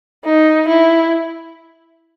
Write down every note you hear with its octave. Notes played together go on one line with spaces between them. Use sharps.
D#4
E4